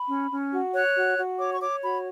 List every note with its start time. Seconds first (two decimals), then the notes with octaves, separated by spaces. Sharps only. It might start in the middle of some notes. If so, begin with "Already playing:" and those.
Already playing: B5
0.09 C#4
0.31 C#4
0.52 F#4
0.74 C#5 F#6
0.95 F#4
1.18 F#4
1.39 C#5 D6
1.54 C#6
1.61 C#5 D6
1.82 F#4 B5